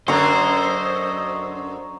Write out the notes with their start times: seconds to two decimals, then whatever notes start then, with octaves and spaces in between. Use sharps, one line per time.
0.08 F#2 D3 C5 D#5 A#5 C#6